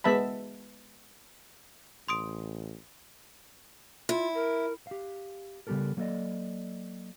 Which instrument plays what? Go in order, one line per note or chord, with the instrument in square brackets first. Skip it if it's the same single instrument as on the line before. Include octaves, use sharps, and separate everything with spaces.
[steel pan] G#3 B3 E5 A5 B5
[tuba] A1 [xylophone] C6 D#6 D7
[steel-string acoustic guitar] E4 [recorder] F4
[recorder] A#4
[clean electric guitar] G4 F5
C#3 G3 B3 G4 A4 A#4
F#3 A#3 A4 A#4 D5 D#5